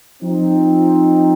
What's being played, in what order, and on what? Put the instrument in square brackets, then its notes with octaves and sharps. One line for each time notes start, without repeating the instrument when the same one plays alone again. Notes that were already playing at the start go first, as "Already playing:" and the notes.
[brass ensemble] F3 C4 D#4